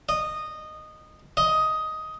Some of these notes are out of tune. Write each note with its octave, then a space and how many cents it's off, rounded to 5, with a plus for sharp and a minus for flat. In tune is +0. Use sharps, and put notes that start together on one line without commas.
D#5 -15
D#5 +10